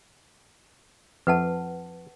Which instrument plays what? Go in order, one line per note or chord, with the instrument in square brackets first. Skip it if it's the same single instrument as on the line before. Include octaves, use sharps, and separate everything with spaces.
[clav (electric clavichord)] F2 E5 [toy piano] B4 F#5 A5